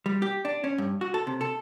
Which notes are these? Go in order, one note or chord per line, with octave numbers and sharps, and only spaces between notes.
G3
G4
D4
C#4
G2
F#4
A4
C3
A4